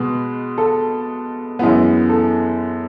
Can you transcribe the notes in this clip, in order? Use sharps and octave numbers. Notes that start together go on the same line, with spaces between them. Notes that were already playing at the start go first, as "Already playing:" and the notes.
Already playing: B2 G#3 B3
A4
F#2 E3 G#3 B3
A4